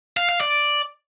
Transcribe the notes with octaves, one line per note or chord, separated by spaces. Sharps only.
F5
F5
D5